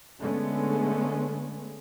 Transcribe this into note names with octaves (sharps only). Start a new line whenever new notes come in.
D3 G#3 A3 B3 C#4